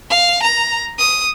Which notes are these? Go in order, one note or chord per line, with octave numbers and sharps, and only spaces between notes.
F5
A#5
D#6